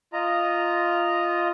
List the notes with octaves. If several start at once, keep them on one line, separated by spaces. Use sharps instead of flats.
F4 D#5 A#5